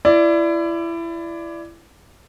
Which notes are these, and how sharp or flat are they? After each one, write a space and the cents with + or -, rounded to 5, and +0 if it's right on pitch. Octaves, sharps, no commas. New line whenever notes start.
E4 +25 D5 +0